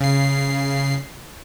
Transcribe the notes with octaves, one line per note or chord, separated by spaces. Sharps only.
C#3 C7